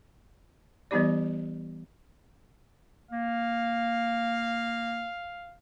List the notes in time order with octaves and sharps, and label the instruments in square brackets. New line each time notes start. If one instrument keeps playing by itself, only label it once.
[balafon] E3 G3 B3 D#4 G4 D5
[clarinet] A#3 [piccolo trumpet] F5